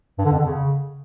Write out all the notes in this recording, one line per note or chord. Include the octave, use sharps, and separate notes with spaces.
G2
D3
F2
D3
C#3